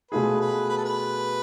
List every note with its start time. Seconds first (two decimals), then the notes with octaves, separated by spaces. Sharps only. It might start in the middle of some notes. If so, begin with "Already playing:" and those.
0.11 B2 A3 F4 G#4 B4
0.40 B4
0.69 B4
0.77 A4
0.85 B4